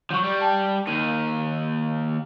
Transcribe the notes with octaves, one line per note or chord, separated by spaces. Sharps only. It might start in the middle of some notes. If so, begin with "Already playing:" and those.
F3 F#3 C#6 G6
G3
G5 A5
D#2 D#3 D#7